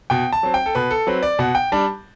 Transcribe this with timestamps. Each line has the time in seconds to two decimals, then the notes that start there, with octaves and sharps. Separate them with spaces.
0.10 B2 G5
0.33 A5
0.43 F#3 C4
0.54 G5
0.66 A4
0.75 B2 B4
0.91 A4
1.07 F#3 C4 B4
1.23 D5
1.39 B2 F#5
1.55 G5
1.72 G3 D4 A5